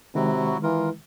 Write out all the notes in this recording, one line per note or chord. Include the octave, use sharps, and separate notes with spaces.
C3 D#3 F#3 G#3 E4 F#4
E3 F4 A#4